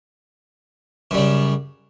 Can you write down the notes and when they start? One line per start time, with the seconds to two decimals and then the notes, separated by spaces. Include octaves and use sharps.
1.11 F#2
1.14 G3
1.18 C#3